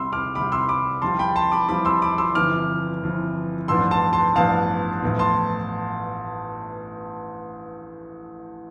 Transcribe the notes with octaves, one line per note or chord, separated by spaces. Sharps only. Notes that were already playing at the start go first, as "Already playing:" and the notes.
Already playing: C2 C3 G3 B5 C6 E6
D6 F6
C2 C3 G3 B5 D6
C6 E6
B5 D6
F2 E3 G3 C4 F4 A5 C6
G5 B5
A5 C6
B5 D6
F2 E3 G3 C4 F4 B5 D6
C6 E6
B5 D6
C6 E6
G1 F2 E3 D6 F6
G1 F2 E3
A1 G2 F3 B3 D4 C6 E6
A5 C6
A5 C6
A1 G2 F3 B3 D4 F5 A5
A1 A2 F3 B3 F4
A5 C6